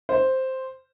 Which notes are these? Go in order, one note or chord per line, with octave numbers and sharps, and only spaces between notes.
C5